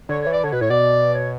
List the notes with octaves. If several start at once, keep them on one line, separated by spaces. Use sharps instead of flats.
D3 C#5
C#5
E3
D5
D3 C#5
B2 B4
A2 C#5
B2 D5
C#5